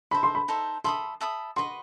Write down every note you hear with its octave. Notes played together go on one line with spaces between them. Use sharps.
D#4 A4 C5 E5 B5
C6
B5
D#4 A4 C5 E5
A4 E5 B5 C6 D#6
A4 E5 B5 D#6
F#4 B4 D#5 C6